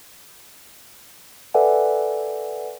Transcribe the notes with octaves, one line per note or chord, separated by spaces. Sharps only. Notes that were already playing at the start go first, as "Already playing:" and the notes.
A4 B4 D5 E5 F#5 G#5